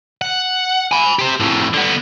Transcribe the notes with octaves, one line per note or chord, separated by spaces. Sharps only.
F#5
G#5 B5
G4 C5
F2 A2
D3 B3